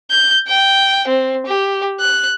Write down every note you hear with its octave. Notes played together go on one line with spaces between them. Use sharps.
G6
G5
C4
G4
F#6